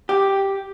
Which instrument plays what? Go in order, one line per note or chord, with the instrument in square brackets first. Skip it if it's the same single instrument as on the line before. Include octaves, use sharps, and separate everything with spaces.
[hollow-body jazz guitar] G4